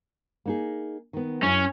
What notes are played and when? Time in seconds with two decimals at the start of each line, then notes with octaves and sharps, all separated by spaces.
0.46 A#3 D#4 G#4
1.13 D#3 B3
1.43 F#2 C#4 E4 E5